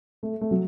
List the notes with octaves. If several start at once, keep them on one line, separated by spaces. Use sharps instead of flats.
A3
A3
F#3